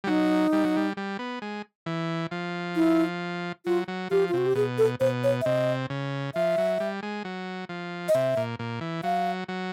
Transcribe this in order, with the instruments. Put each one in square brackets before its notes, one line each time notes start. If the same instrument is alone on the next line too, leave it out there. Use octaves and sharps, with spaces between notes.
[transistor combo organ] G3
[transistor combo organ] F#3 [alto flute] D#4
[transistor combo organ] G3
F#3
G3
G3
B3
G#3
E3
F3
[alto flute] E4
[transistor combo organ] F#3 [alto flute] F4
[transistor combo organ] F#3
[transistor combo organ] F3 [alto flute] G4
[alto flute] F4
[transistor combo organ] C3 [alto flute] F#4
[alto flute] G4
[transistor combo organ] B2 [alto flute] G#4
[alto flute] A4
[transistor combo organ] B2 [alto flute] C5
[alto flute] C#5
E5
[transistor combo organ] C3 [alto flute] D#5
[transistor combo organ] C#3
[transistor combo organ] F3 [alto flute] E5
[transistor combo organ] F#3
G3
G#3
F#3
F3
[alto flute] D#5
[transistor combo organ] C3 [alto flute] E5
[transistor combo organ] A#2
A#2
E3
[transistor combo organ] F#3 [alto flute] F5
[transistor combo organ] F#3